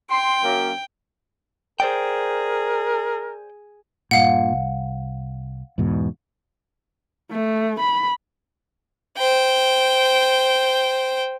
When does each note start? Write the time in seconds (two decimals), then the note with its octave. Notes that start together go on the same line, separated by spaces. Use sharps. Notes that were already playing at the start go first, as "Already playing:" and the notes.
0.11 G5 C6
0.44 F#2 A#3
1.80 G#4 A#4 C5 D5 G5
4.11 G2 A#2 F5 F#5
4.52 C2
5.78 E2 G#2 B2
7.31 A3
7.80 B5
9.18 C5 G5